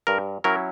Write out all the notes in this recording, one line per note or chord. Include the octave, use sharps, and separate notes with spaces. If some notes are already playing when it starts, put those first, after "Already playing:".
G2 A#4
F#3 C#4 E4 A#4